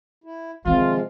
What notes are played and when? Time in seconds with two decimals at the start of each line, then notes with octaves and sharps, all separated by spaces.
0.24 E4
0.65 C3 D#3 F3 G#3 C4 F4